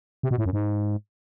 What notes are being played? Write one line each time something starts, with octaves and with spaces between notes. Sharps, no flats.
C3
B2
A2
F#2
G#2